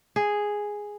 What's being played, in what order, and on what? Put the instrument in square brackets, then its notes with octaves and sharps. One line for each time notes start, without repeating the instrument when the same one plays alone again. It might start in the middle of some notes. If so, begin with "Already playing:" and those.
[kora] G#4